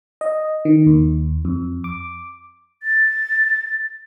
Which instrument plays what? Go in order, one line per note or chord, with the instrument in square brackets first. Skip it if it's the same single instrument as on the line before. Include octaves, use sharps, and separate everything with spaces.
[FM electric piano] D#5
D#3
D#2
F2
D6
[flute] A6